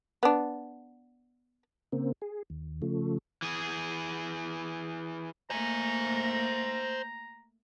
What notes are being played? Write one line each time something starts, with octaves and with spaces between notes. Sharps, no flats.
B3 D4
C#3 A#3 C4
G#4
D#2
C#3 F3 A3
E3 G#4
A3 A#3 C5 G#5 A#5